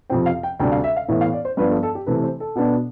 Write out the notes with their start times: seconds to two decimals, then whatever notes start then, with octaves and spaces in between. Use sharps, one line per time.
0.10 F2 C3 F3 C4 G5
0.26 F5
0.43 G5
0.59 D2 C3 G3 D4 G5
0.72 F5
0.84 E5
0.96 F5
1.09 A2 E3 B3 E5
1.21 F5
1.33 D5
1.45 C5
1.57 G2 F3 B3 D4 B4
1.70 A4
1.83 A4
1.95 G4
2.07 C3 E3 A3 C4 B4
2.24 C5
2.40 A4
2.56 B2 B3 D4